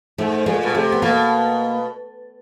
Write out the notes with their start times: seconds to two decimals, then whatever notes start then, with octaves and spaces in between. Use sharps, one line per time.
0.18 G#2 A3
0.46 A#2 G#3
0.63 B2
0.75 C3 A3
0.92 B3
1.02 B2 A#3